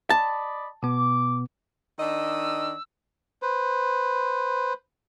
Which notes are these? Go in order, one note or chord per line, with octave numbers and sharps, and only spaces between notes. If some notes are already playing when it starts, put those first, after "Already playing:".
D5 D#5 A5 B5
B2 B3 D6
D#3 D4 D#5 E6
B4 C5